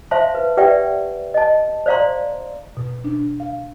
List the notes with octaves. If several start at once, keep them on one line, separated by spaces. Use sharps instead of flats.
C5 E5 F5 A5 C6
B4
G4 B4 D5 E5 F#5 G5
D#5 A5
C5 D5 F5 A#5 C6
B2
D4
F5